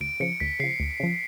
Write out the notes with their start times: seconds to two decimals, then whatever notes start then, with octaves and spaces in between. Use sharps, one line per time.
0.01 D2 D7
0.20 C#3 F3 C#7
0.40 D2 B6
0.59 C#3 F3 C7
0.80 D2
1.00 C#3 F3